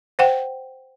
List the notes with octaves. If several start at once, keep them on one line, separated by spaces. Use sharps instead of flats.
C5 F#5 G5